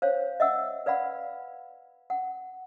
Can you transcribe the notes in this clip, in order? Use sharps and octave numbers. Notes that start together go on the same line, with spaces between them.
C5 C#5 F5
D#5 E5 F#5 E6
B4 D5 F5 F#5 B5
F#5